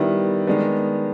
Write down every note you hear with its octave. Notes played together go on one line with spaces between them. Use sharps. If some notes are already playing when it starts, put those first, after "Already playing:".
Already playing: D#3 G3 B3 E4
D#3 G#3 B3 D4